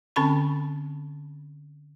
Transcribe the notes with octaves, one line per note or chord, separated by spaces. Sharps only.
D3 C4 C#4 A5 B5 C#6